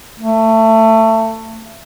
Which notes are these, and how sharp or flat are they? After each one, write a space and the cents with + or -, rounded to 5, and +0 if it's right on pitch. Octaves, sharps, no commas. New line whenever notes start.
A3 +20